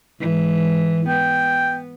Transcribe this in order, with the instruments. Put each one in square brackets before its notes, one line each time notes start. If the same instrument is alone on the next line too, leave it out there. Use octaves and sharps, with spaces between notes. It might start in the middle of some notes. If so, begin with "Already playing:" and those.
[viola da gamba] G#2 E3
[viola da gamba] B3 [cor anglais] G5